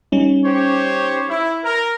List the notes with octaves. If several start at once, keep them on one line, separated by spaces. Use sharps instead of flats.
G3 C#4 D#4
G4 C5 C#5
E4
A#4